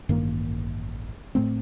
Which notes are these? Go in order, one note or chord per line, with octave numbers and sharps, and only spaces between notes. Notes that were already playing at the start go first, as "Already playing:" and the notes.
A1 G2 D#3 A#3
A2 A3 C4